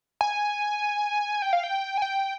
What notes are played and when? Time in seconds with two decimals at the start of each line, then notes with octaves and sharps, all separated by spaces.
0.21 G#5
1.42 G5
1.53 F5
1.63 G5
1.98 G#5
2.02 G5